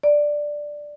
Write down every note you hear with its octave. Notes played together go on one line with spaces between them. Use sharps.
D5